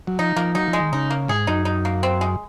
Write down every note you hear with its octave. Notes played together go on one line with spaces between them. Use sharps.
F#3
F3 D#4
F3 A#3
F#3 D#4
F3
G#3
D#3
C#3 D#4
A#3
G#2 G#4
F#2 D#4
D#4
A#3
C4
G#3